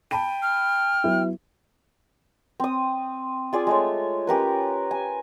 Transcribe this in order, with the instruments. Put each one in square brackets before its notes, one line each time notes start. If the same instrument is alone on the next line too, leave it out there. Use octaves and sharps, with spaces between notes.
[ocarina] G5 [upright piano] A5 B5 D#7
[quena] F6
[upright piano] F#3 B3 E4
[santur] C4 D#6
F4 G#4 D5
G#3 A3 C#5
C#4 G4 A#4 B4
G#5